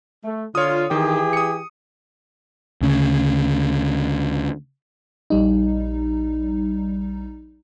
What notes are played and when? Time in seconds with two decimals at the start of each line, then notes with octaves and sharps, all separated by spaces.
0.24 A3
0.55 D3 F4 C#5 D#6
0.91 D#3 E3 G4 G#4
1.33 D#6 C#7
2.81 D2 C#3
5.30 A#1 G3 D#4